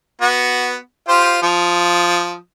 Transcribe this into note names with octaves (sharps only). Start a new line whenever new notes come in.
B3 F#4
F4 G4 C5
F3 D#6